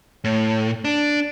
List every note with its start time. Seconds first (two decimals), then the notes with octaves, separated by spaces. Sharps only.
0.24 A2
0.85 D4